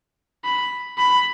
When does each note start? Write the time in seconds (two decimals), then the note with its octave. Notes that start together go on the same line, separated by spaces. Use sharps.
0.44 B5
0.98 B5